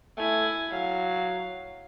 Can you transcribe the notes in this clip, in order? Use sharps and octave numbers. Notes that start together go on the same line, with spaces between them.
A3 E4 G#5
F#3 F5